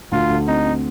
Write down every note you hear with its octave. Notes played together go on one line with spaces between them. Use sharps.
D2 F4
D2
C4 D#4
C4